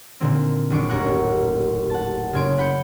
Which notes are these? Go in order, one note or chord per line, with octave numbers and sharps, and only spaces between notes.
A#2 D3 D#3 A#3 C4
F#1 D#3 D4 C#6 D6 D7
D#1 A1 A#4 F#5 C#6 F#6
F#5 A5
F#1 C#3 G#5 C6 D7
F#5 B5 G6 C#7